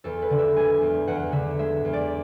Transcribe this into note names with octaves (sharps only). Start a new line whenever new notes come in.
E2 A4
B4
D3
E5
G#3 G#5
E2
E2 F#5
D3 E5
G#3 E5
E2
D5